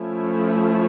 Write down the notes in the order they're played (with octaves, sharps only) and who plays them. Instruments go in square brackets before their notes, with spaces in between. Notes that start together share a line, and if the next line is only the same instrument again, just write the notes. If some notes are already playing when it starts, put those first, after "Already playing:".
Already playing: [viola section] F3 A3 C#4 E4